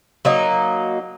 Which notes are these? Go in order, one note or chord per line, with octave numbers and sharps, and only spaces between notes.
F#3 A#3 D#4